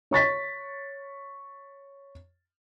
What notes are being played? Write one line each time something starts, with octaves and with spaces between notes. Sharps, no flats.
C#5 C#6 A6 B6